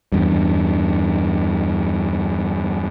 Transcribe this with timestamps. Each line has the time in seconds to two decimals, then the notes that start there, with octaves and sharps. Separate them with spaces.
0.12 E2 G2